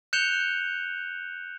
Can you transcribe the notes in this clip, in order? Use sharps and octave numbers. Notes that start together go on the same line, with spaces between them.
F#6 G6 C#7 E7 F7 G7